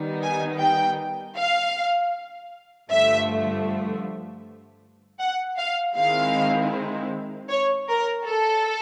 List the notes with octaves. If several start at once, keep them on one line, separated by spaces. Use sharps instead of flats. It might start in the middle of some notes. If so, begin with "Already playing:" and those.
Already playing: D#3 G3 B3 D#4
G#5
G5
F5
G2 D3 F3 A3 E5
F#5
F5
D#3 G#3 C4 E4 F5
C#5
A#4
A4